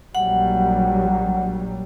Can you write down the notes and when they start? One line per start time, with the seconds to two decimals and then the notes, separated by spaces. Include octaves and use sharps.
0.15 A#1 F#3 G3 F#5